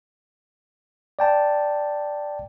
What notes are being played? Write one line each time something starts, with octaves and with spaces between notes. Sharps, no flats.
D5 G5 A5